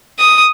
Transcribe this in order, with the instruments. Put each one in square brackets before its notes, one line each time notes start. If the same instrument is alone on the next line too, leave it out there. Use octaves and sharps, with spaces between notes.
[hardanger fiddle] D#6